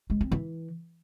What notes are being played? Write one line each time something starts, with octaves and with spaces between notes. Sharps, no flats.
G#3
C4
E3